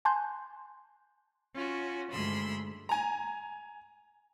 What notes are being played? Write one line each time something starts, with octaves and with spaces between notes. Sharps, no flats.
G#5 A5 C6 F#6 G6
C#4 F4 F#4
D2 G2 G#3 B5 C6 E6
G#5 A#5